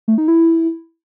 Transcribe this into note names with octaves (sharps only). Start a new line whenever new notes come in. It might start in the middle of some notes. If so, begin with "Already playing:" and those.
A3
D#4
E4